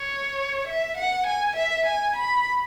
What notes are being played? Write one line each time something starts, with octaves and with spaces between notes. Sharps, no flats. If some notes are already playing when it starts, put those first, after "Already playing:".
Already playing: C#5
E5
F#5
G#5
E5
G#5
B5